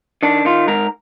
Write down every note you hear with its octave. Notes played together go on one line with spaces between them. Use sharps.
D#3 D4
D#3 F4
G#2 A#4